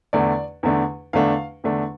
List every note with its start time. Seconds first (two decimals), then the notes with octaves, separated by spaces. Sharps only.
0.13 E2 D3 A3 D4 D5
0.63 E2 D3 A3 D4
1.13 E2 D3 A3 D4 F5
1.64 E2 D3 A3 D4